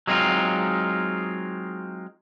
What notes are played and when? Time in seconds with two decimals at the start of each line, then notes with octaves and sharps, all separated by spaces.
0.07 F#3 G#3 C4 D#4 F4